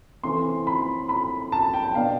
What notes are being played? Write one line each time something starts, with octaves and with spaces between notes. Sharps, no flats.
C3 E3 A3 C4 C6
B5
B5
A5
G5
B2 B3 D4 F5